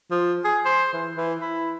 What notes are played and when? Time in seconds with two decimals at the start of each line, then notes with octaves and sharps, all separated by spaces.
0.11 F3
0.44 G#4
0.66 C5
0.93 E3
1.17 E3
1.41 E4